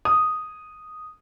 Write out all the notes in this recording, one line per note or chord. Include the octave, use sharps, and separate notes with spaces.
D#6